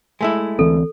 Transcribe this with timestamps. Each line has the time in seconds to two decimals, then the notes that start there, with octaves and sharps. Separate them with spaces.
0.21 G#3 A3 E4
0.59 D2 E3 C4 A4